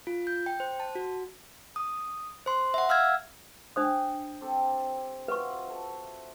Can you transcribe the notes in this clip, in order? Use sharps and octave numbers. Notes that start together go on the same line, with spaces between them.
F4
G6
G5
C5
A5
F#4
D#6
C5 C6
E5 F#5
F5 E6 F6 G#6
D4 C5 G5 D#6
C4 G4 A4
F4 F#4 B4 E5 C#6
A4 E5